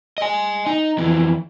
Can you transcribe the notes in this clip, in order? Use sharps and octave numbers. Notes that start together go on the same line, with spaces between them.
D#5 G#5
D#4
F2 E3